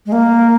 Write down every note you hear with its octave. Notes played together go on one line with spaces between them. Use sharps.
G#3
A#3